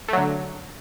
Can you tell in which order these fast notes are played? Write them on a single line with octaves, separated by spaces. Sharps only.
A3 F#3 D3